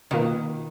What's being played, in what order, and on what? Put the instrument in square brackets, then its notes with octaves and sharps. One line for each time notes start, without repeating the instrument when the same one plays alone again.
[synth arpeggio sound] B2 A#3 F4 B4 [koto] D#3